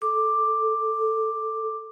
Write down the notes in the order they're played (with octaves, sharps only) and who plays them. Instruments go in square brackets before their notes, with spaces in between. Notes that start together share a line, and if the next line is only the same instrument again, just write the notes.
[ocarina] A4 [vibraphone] D6